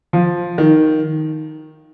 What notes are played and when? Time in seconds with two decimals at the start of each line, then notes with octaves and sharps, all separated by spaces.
0.13 F3
0.58 D#3